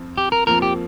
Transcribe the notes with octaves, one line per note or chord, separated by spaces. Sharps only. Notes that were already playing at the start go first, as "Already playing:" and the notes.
Already playing: F2 F3 C4
G4
A#4
F2 F3 A#3 A#4
G4